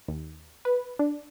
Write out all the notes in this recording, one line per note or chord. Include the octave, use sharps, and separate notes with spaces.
D#2
B4
D4